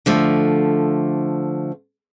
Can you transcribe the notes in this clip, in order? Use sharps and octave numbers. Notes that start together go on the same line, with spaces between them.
D3 F3 A3